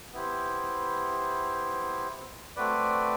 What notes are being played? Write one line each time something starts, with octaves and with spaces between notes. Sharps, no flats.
B3 E4 G4 C5
A3 C4 F#4 B4 D5